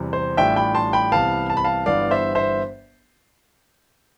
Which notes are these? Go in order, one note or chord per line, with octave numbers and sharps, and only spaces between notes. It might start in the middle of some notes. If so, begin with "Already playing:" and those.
Already playing: E2 C3 G3 C4
C5
A1 A2 G3 D4 F4 E5 G5
G5 B5
A5 C6
G5 B5
C2 C3 E3 B3 F5 A5
A5
B5
F5 A5
G1 G2 E3 G3 B3 D5 F5
C5 E5
C5 E5